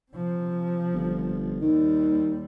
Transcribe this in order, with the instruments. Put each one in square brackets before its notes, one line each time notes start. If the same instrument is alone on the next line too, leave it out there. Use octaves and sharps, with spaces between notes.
[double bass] C3 F3
[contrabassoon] G1
[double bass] D#2 G3 [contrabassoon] D#3